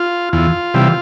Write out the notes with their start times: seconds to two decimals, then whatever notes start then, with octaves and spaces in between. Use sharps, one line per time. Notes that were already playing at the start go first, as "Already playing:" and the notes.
Already playing: F4
0.33 E2 F4
0.74 C3 E3 G3